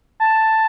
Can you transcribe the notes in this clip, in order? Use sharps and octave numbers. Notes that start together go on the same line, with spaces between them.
A5